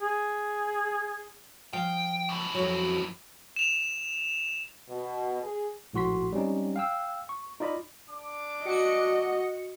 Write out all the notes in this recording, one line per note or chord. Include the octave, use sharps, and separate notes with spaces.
G#4
F3 F5 G5
F#2 E3
F2 F#3
E7 F7
B2
G#4
A#1 A2 F#4 C6 B6
G3 C4 C#4 D#4
F5 G5 E6
C#6
D#4 F4 D5 D#5 B5
D4 D6
F#4 D#5 C#7